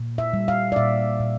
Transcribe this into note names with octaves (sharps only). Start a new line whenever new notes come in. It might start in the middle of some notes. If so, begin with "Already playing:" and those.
Already playing: A#2
E5
G3
F5
D5
A#2 E5
A#2